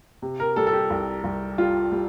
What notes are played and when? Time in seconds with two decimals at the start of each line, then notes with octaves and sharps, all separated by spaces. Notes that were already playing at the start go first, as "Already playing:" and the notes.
0.22 C3
0.40 A#4
0.56 G3 A4
0.67 A4
0.73 G4
0.90 C2
1.24 C2
1.58 G3 F4
1.92 G3